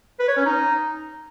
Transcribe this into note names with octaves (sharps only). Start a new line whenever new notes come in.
B4
C#5
C#4
D#4